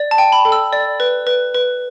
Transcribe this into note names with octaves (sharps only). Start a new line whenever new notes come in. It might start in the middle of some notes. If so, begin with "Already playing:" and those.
Already playing: D5
A5
G5
B5
A4
E6
D5
B4
B4
B4